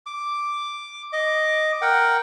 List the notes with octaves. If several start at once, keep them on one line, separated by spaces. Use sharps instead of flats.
D6
D#5 D6
A#4 F#5 G5